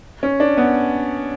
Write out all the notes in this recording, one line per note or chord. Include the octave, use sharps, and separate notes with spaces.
C#4
D4
B3